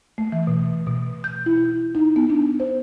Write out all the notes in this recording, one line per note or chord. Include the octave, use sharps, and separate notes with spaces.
A3
E3
B2
B2
G6
E4
D#4
B3
D4
C5